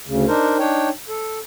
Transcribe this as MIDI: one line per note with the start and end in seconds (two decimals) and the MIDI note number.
0.07 0.25 38
0.07 0.25 49
0.28 0.57 62
0.28 0.57 63
0.28 0.57 70
0.28 0.57 72
0.59 0.89 62
0.59 0.89 63
0.59 0.89 73
0.59 0.89 79
1.09 1.39 69